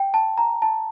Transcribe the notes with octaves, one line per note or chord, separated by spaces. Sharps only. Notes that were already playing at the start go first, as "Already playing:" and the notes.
Already playing: G5
A5
A#5
A5